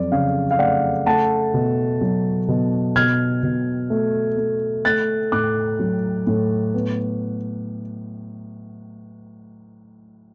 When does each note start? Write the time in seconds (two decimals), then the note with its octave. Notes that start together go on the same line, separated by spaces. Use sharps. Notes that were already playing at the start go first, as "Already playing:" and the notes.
Already playing: F2 F#3 D5
0.12 C#3 F5
0.51 F5
0.59 A3 D5 F#5
1.06 A3 F#5 A5
1.54 B2
2.01 F#3
2.48 B2
2.95 B2 F6 G#6
3.43 B2
3.90 A3
4.38 A3
4.85 A3 F#6 A6
5.32 A2 D6 F#6
5.79 F#3
6.27 A2
6.74 B3